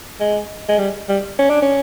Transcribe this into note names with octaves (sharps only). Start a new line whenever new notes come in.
G#3
G#3
G3
G3
C#4
D4
C#4